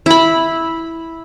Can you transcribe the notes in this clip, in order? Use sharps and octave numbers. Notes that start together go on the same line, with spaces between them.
E4 B5